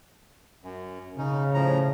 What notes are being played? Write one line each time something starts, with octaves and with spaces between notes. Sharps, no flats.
F#2
C#3 C#4 D#4
A2 F3 A#5